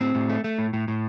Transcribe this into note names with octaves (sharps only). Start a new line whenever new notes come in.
A2 C4
A2
A3
A3
A2
A2
A2